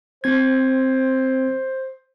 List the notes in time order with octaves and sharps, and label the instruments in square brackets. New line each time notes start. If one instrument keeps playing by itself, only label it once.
[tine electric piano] C4 G#6 [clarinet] C5